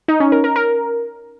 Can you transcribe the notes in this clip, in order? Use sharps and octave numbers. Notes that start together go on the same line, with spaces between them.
D#4
C#4
A#4
A#4
A#4